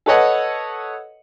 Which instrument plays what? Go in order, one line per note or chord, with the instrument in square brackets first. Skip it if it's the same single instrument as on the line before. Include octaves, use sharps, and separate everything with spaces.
[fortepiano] A4 B4 C#5 D#5 F#5